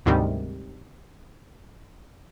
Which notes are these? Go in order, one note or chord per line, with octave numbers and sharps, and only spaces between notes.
D2 G#2 C3 D#3 G3